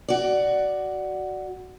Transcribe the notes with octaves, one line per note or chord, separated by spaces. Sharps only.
F#4 D5